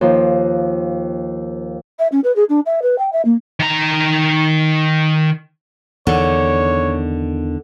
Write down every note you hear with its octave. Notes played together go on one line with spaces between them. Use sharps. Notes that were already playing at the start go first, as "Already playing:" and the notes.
D#2 F3
E5
C#4
B4
G#4
D4
E5
B4
G5
E5
A#3
D#3 A#5
E2 D3 D#3 C#5